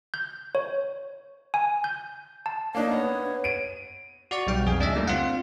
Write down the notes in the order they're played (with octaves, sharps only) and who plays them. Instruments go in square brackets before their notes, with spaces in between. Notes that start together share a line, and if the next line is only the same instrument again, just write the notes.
[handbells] G6
C#5
G#5
G6
A5
[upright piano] A#3 D4 D#4 [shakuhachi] C#5
[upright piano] B3
D7 D#7
[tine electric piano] F#4 D5 C#6
B1 G3 G5 F6
F2 G#4 G#5
C#2 D4 D#5 E5
G3 A3 A#3 D#4
C4 F4 F5 F#5